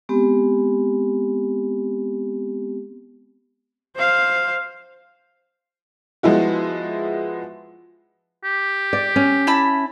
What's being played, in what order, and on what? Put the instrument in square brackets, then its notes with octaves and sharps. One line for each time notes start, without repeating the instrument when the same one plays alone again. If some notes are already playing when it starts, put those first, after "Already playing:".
[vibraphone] G#3 B3 C4 G4
[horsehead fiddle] C5 F5
[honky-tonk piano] F3 G#3 B3 E4 F#4
[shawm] G4
[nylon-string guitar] D5
C#4
[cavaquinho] E4 A5 B5